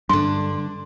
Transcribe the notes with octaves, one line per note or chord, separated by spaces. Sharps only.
G2 D3 D4 C6